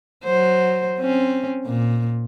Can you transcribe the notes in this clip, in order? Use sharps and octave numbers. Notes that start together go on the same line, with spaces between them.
F#3 C5
C4 C#4
A#2